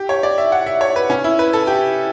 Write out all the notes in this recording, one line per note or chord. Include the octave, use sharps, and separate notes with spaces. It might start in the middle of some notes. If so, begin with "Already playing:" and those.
Already playing: G4
C#5
D5
E5
F#5
E5
C#5
B4
C#4
E4
B4
A4
G4